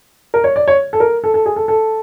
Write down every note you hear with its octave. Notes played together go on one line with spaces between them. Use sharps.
A#4
C#5
D5
C#5
A4
A#4
A4
A4
G#4
A4
A4